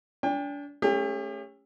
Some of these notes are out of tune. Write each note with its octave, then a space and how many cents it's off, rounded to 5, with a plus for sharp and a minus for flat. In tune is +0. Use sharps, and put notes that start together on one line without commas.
D4 -35 G5 +35
A3 +0 C#4 +0 G4 +40